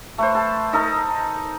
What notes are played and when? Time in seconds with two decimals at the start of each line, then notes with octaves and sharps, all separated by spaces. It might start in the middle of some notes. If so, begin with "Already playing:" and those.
0.18 A3 B4 C5
0.35 A4 A5
0.73 D#4 A4 A#4 D#5